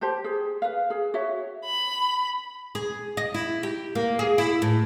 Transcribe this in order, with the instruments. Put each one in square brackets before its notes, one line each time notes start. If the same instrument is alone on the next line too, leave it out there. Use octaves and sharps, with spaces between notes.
[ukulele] G4 C5 A5
G#4
B4 F5
G#4
F#4 C#5 E5
[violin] B5
[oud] G#4
D#5
E4
G4
A#3
G#4
E4
A2